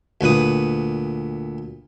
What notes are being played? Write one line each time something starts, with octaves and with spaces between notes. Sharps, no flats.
D2 A#2 B4 D#6